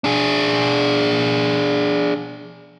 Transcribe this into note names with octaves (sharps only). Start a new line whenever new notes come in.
D4 G#4